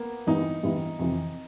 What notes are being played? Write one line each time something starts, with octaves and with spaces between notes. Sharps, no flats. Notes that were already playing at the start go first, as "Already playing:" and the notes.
Already playing: A#3 B3
G2 E3 G3 B3 D#4 E4
G2 E3 G3 B3 E4
F2 C3 E3